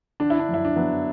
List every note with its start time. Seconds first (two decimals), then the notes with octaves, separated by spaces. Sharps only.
0.20 D3 D4
0.30 E4
0.39 D4
0.49 F#2
0.54 E4
0.65 D4
0.76 F#3 B3